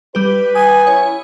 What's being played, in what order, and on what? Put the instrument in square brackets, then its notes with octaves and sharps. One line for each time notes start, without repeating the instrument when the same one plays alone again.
[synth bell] G3 G4 [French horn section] B4
[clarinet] G#5 [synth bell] D#6
[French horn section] C#4 E4 [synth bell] C#5